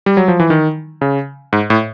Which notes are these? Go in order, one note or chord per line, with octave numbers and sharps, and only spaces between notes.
G3
F#3
F3
E3
D#3
C#3
G#2
A2